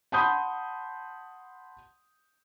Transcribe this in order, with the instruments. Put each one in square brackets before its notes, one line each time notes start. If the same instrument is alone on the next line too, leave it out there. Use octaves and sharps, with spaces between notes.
[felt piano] F#5 A5 B5 C6 D#6 G6